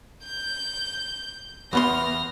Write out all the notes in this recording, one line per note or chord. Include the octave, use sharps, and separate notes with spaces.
G6
E2 B3 C6 F6 A#6